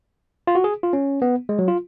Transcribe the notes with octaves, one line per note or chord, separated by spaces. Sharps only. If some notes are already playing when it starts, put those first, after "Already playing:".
F4
F#4
G#4
F4
C#4
B3
G#3
F#3
F4